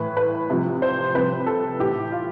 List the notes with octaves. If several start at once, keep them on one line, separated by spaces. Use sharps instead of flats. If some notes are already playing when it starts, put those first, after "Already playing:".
Already playing: A2 E3 B4
B4
C3 F3
C5
C3 F3 B4
A4
A2 E3 G4
F4